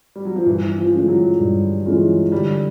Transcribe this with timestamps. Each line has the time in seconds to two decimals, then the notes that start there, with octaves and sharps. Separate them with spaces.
0.16 G3
0.25 F#3
0.36 F3
0.46 G2 E3
0.78 F3
0.93 E3 G#3 C#4 F4
1.08 F#3
1.40 G2
1.86 E3 G#3 C#4 F4
2.32 D3 G3